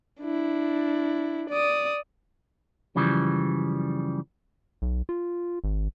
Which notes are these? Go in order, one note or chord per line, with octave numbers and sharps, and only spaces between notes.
D4 E4
D5 D#6
F#2 C#3 E3 F3 G3
B1
F4
G#1